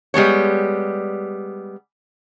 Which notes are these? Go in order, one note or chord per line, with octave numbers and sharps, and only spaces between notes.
G3 G#3 B3 C#5